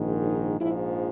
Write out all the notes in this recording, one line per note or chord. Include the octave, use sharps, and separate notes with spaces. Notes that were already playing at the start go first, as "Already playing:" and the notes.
Already playing: A#1 G#2 D#3
D#4
A#1 G#2 F3 E4